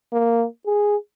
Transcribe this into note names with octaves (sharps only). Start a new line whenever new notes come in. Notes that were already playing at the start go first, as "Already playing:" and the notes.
A#3
G#4